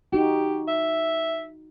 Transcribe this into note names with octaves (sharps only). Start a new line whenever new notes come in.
D#4 F#4 G4
E5